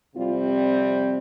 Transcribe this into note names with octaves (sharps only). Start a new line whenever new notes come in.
F2 C3 G3 C4 F4